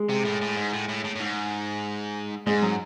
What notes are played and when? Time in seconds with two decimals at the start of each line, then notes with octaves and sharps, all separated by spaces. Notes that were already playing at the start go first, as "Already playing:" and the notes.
Already playing: G#3
0.09 C3
0.25 A2
0.41 A2
0.57 G#2
0.73 A2
0.88 A2
1.04 A2
1.15 A2
1.20 G#2
2.47 G#2 G#3
2.62 F#3